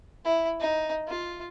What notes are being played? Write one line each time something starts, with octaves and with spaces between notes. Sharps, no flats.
E4
D#4
F4